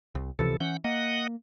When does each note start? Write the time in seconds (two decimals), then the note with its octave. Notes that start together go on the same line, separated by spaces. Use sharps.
0.15 C2
0.39 C#2 C3 E3 F3 A4
0.60 E3 C#4 F#5 G6
0.84 A#3 D#5 F#5